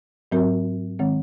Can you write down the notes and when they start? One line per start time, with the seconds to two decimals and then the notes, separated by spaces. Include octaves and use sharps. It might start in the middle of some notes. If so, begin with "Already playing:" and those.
0.32 G#2 F#3 C4 F#4 A#4
0.99 D#3 G#3 C4